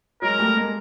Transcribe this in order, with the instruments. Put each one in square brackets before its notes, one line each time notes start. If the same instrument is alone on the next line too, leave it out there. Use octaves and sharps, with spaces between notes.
[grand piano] F#3 G#3 [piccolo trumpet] A#4
[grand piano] G3 A3
G#3 A#3